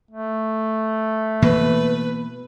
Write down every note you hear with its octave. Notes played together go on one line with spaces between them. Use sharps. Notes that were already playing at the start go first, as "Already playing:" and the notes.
A3
B2 E3 A#3 B4